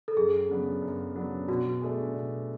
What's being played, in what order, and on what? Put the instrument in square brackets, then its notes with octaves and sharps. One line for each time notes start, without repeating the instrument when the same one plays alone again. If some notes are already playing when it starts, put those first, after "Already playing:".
[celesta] A4
[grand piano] F#2 [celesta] G#4
[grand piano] C#3 F#3 B3 D4
F#2
C#3 F#3 B3 D4
[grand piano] B2 [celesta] F#4
[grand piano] A3 D4 G#4
B2